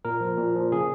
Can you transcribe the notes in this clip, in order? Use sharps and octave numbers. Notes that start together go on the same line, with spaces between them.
A#2 A#4
F3
A#2
F3
C#3 G#4